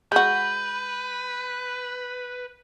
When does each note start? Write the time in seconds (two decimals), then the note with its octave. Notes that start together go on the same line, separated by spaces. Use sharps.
0.12 G#3 F#4 B4 G6